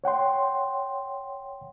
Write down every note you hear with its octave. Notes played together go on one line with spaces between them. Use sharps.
C#5 F#5 G5 C6